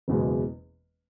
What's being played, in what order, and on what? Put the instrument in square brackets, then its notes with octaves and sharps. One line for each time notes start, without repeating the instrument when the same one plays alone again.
[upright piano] F#1 E2 B2 G#3